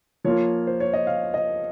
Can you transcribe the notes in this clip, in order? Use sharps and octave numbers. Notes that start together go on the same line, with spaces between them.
F3 A#3 F4 C#5
C5
C#5
D#5
F5
D#5